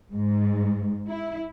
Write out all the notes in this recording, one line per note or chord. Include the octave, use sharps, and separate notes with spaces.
G#2
E4